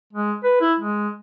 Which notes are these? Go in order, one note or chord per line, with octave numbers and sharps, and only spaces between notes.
G#3
B4
E4
G#3